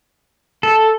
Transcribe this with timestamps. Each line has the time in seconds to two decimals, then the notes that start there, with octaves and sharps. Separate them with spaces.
0.63 A4